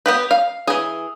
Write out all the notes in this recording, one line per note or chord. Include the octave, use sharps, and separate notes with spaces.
B3 G4 B4
F5
E3 G#4